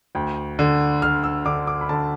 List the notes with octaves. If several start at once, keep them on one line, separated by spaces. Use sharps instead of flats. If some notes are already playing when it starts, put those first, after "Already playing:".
D2 G5
D3
D3 F6
E6
D3 D6
D6
B5
D3 A5